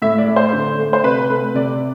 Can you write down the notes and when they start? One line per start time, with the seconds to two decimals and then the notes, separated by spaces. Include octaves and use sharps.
0.02 A2 E5
0.18 D5
0.28 A3
0.36 C5
0.53 D3
0.78 A3
0.93 C5
1.04 C3 B4
1.30 A3
1.54 C3 D5